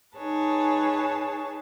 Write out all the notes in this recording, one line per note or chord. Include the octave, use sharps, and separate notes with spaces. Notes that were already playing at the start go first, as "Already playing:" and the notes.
D#4 G#4 B4 C#5 A5